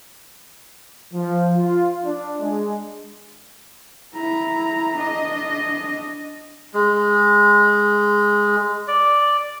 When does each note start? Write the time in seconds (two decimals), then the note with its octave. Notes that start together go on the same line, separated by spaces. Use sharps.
1.14 F3
1.57 F4
2.04 D4
2.40 G#3
4.15 E4 A#5
4.96 D4 D#5
6.74 G#3
8.88 D5